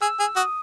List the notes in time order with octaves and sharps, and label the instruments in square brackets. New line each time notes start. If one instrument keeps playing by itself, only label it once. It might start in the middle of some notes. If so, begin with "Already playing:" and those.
[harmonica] G#4 [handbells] E6
[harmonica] G#4
[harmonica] F#4 [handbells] D#6